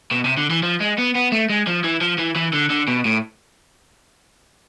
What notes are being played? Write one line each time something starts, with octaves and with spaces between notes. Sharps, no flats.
B2
C3
D3
E3
F3
G#3
B3
B3
A3
G#3
F3
E3
F3
E3
E3
D3
D3
B2
A2